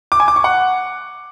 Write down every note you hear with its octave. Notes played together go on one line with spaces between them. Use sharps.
D6
G#5
D6
C#6
F#5